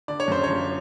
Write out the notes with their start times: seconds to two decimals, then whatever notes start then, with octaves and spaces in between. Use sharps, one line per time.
0.08 D3 D5
0.20 C#5
0.28 F#2 C5
0.44 F3 C#5